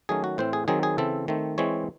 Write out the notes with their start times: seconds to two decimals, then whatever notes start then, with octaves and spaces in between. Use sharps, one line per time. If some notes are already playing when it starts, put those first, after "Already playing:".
0.09 D#3 F#3 A3 C#4 G#4
0.24 F#4
0.38 A2 E3 C4 C5
0.53 G#4
0.68 D#3 F#3 C4 G#4
0.83 G#4
0.98 C#3 E3 C4 A4
1.28 D#3 A3 C4
1.58 E3 G#3 C4 C#5